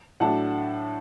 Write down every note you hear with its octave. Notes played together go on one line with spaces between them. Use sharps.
A2 F#3 A3 D4 F#5 A5